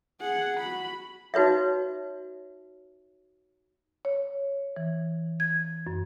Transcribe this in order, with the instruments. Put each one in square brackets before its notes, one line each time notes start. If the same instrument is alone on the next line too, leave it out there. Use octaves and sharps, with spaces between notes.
[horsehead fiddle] G#4 F#5
F#4 B5
[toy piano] D#4 F#4 B4 C#5 E5
[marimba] C#5
E3
G#6
F#2